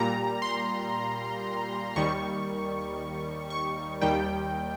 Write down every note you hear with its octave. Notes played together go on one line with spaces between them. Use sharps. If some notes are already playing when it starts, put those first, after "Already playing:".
Already playing: A#2 G3 A#5
C6
D#2 D#3 G3 C#6
C#6
D#2 D#3 G3 G5